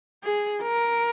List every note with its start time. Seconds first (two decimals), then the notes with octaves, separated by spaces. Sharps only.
0.24 G#4
0.62 A#4